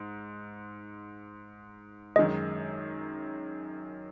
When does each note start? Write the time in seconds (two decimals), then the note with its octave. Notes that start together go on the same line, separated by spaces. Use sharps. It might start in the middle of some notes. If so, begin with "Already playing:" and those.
Already playing: G#2
2.16 F#2 D#3 G#3 D#5